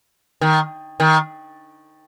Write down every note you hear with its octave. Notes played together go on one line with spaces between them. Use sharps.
D#3
D#3